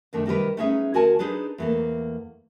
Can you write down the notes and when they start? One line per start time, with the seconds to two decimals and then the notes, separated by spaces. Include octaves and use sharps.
0.13 F#2 D#3 A3 D4
0.26 C3 D#3 G3 A#4 B4
0.57 A3 B3 C#4 D#4 G#4 E5
0.94 D2 F#4 A#4 G#5 A5
1.19 D4 D#4 G#4 B4 C5
1.58 E2 A3 A#3